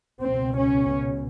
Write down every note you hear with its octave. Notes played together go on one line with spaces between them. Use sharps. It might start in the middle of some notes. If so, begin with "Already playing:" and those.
C#2 B2 C4
C#4